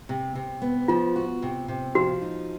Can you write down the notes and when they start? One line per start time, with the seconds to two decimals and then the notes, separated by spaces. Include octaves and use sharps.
0.09 C3
0.35 C3
0.62 B3
0.88 F3 F4
1.16 F#4
1.42 C3
1.68 C3
1.95 F3 F#4
2.22 D#4